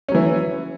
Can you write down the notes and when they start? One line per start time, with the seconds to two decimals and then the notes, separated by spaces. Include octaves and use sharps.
0.08 C#4
0.12 F#3
0.15 E3